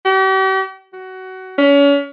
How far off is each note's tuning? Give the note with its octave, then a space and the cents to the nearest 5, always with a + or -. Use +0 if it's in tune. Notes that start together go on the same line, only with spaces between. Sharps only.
G4 -45
F#4 +20
C#4 +35